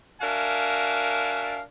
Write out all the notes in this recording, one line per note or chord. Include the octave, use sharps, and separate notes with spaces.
D4 F#4 A#4 E5 F5 G#5